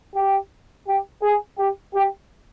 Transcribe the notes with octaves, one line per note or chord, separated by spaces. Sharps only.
G4
G4
G#4
G4
G4